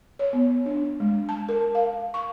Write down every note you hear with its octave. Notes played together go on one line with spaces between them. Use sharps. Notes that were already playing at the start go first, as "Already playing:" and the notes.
C#5
B3
D4
G#3
A5
A#4
F5
C#6